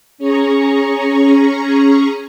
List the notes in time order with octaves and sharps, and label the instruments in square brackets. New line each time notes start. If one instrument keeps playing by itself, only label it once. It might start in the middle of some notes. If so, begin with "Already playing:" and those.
[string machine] C#4 G#4 A#5 C#6